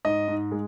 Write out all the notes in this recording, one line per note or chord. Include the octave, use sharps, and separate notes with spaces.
G#2 D#5
G#2
G#3